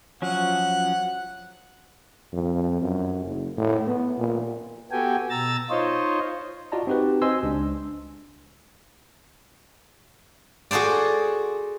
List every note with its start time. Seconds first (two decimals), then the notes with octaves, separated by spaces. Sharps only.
0.22 F3 F#3 C#4 F#5
2.33 F2
2.82 F#2
3.25 F#1
3.57 A2
3.87 B3
4.18 A#2
4.91 B3 F#4 G4 A4 G5 G#5
5.30 B2 A#5 E6 A6
5.70 D#4 F4 C5 C#5 D#5
6.72 F4 F#4 D5 D#5 A5 A#5
6.87 C4 D#4 F#4 G4 B4
7.22 C5 D#5 G#5 C6 E6
7.43 C#2 D4
10.71 F#4 G#4 A4 C5 D5